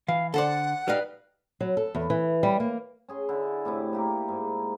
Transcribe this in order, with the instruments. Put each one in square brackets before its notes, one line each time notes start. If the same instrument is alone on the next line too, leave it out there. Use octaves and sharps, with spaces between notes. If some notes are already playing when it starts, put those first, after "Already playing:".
[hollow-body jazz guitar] E3 [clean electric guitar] F5
[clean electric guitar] D3 [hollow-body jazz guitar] A4 C5 D5 [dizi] F#5
[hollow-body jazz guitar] G3 D#4 F5 [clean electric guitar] B4
[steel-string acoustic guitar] F#3
A4
E2
E3
G3
A#3
[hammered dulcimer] C#4 G#4 C6
D3 E4
A2 C3 E4
A#3 G4 A#4
G#2